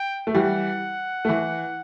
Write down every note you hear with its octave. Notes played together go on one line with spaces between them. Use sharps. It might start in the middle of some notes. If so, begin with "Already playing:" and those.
Already playing: G5
A3
E3 G3 F#5
A3
E3